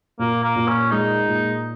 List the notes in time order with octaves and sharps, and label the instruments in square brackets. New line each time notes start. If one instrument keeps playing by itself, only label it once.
[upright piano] A#2 [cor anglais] A#3
[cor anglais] A#3
[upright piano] A#2
[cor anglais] C#4
[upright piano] G#3 [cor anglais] D#4
[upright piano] A#2